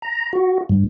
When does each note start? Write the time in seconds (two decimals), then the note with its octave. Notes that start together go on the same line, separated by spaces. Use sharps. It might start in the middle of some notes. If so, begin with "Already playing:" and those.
0.02 A#5
0.33 F#4
0.69 G2